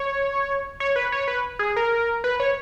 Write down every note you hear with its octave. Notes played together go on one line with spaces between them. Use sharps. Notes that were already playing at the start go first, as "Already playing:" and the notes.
Already playing: C#5
C#5
B4
C#5
B4
G#4
A#4
B4
C#5